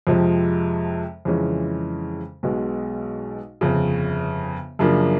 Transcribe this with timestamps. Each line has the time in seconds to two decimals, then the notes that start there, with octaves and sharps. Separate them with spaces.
0.07 F2 C3 F3 G#3
1.25 F2 C#3 E3 G#3 C#4
2.43 B1 B2 G#3
3.61 G1 F2 C#3
4.79 F#2 C#3 F3 A#3 D4